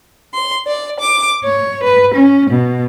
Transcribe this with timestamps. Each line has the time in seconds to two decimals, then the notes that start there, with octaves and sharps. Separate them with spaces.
0.33 C6
0.66 D5
0.99 D6
1.44 C#5
1.83 B4
2.15 C#4
2.51 B2